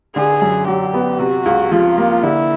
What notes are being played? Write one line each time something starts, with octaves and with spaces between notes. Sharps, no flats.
D3 G#4
F#2
F#3 G4
B3
C3 F#4
C#2
F3 F4
A#3
D3 E4